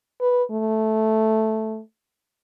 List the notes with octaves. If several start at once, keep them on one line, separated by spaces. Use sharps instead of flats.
B4
A3